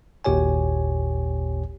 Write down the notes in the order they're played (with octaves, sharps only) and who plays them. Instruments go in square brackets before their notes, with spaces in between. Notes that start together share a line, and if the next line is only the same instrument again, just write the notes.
[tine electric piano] G#1 D#2 A#2 G4 C#5 G#5